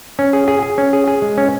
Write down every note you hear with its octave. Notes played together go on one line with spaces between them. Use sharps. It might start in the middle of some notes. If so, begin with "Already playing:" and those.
C#4
G#4
G#4
G#4
C#4
G#4
G#4
G#3
C#4